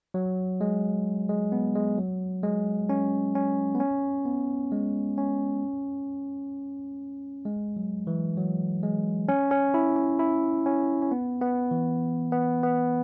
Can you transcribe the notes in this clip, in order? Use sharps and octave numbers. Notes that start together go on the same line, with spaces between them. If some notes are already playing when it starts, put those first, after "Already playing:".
F#3
G#3
G#3
B3
G#3
F#3
G#3
C#4
C#4
B3
C#4
B3
G#3
C#4
G#3
F#3
E3
F#3
G#3
C#4
C#4
E4
C#4
E4
C#4
C#4
B3
B3
E3
B3
B3